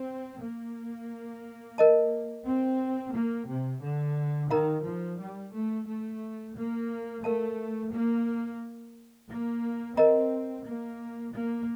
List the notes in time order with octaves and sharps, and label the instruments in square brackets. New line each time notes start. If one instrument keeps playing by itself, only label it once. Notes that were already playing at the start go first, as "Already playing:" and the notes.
Already playing: [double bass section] C4
A#3
[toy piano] A#4 D#5 A5
[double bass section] C4
A#3
C3
D3
[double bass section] D#3 [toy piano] D#4 A#4 F5 A#5
[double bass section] F3
G3
A3
A3
A#3
[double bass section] A3 [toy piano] A#4 F5 A5
[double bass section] A#3
A#3
[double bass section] C4 [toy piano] A#4 D#5 A#5
[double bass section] A#3
A#3